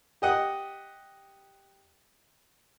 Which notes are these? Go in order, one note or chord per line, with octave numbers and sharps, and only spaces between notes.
G4 D#5 F#5